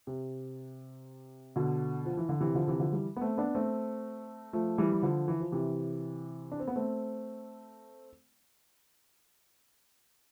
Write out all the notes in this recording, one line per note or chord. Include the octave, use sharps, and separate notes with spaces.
C3
B2 D3
F3
E3
D3
C3 E3
D3 F3
C3 E3
D3 F3
E3 G3
B3
A3 C4
B3 D4
A3 C4
F3 A3
E3 G3
E3
D3 F3
E3
F3
C3 E3
D4
C4
B3
A3 C4